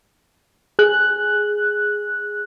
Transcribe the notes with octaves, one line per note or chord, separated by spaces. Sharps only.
G#4 F#6